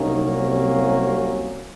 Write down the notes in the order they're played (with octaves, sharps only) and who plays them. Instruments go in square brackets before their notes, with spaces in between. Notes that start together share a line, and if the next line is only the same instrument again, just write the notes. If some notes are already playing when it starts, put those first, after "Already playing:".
Already playing: [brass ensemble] C2 C3 F#3 A#3 C#4 D#4